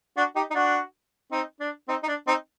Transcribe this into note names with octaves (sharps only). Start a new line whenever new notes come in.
D4 F#4
D#4 G4
D#4
D4 F#4
C4 D#4
D4
C4 D#4
D#4
D4
C4 D#4